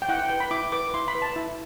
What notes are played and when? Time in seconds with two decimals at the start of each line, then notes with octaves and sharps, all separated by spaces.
0.02 G5
0.09 E4 F#5
0.19 G5
0.29 B4 G5
0.40 B5
0.51 E4 D6
0.72 B4 D6
0.94 E4 C6
1.08 B5
1.15 B4
1.22 A5
1.36 E4